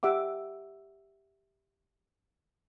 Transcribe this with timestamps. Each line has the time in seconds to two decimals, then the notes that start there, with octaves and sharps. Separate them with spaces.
0.03 G4 E5 F#5 D6